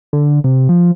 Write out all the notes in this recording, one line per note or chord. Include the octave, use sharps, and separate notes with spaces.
D3
C3
F3